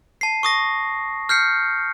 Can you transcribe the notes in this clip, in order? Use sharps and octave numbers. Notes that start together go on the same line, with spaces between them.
A5 C7
C#6 D#6 A#6
F6 G6 C7 C#7